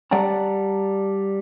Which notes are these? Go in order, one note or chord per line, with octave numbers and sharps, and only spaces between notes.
G3 D5 F#5 A5 A#5